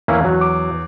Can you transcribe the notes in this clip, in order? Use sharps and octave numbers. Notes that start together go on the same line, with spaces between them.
E2 A#3 C#4 E4
F#3
D6